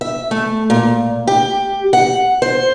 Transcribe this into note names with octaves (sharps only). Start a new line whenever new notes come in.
E5
A3
A#2
G4
F#5
C5